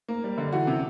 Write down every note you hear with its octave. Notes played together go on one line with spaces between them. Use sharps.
A#3
G3
D3
E3 F#4
C3